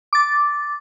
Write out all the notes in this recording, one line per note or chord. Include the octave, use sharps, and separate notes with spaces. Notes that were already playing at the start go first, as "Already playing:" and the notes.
D6 A6